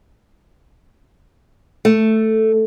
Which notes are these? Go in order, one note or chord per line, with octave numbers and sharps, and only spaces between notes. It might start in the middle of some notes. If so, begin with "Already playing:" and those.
A3